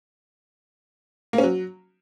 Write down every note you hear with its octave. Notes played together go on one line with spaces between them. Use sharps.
A#3
C#4
F#3